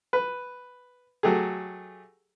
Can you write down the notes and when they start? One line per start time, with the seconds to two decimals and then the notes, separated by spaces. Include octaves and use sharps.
0.13 B4
1.23 F#3 A3 G4 G#4